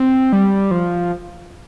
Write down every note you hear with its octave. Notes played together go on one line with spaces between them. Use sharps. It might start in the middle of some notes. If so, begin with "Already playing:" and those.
Already playing: C4
G3
F3